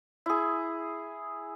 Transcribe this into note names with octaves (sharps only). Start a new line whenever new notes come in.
E4 G#4